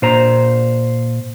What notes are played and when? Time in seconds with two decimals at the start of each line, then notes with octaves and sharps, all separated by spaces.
0.02 A#2 C5 A#5